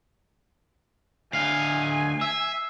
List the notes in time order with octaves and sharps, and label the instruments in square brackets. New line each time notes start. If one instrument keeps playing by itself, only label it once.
[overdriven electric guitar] D2 F5 [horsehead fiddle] G#5 [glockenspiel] C7
[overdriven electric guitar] E5 [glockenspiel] E6